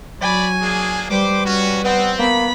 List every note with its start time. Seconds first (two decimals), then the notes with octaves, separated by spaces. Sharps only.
0.22 F#3 D5 G#5 B5
0.62 A#3 D4 G#4
1.11 G3 B4 C5 D6
1.46 G3 C#4 F#4
1.84 B3 C4
2.19 A#3 B3 B5